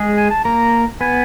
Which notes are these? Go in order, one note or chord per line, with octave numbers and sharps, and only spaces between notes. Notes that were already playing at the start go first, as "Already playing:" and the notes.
Already playing: G#3 G#4
G#5
A5
A#3 A#4 A#5
B3 B4 G#5